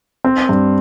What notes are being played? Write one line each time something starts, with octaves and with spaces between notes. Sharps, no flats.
C4
G2